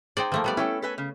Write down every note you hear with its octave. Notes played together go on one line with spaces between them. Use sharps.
D#4 G#4 C5 D5 G5
F3 A3 A#3
G3 B3 D5
C#4 E4 A4 G5
A4 B4 G#5
C#3